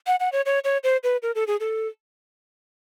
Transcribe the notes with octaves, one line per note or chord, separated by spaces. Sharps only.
F#5
F#5
C#5
C#5
C#5
C5
B4
A#4
A4
G#4
A4